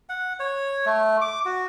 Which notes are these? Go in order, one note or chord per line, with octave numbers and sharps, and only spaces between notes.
F#5
C#5
A3
D6
F#4